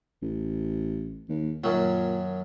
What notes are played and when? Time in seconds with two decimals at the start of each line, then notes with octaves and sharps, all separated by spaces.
0.22 A1
1.29 D#2
1.64 F#2 A#2 D#3 F#3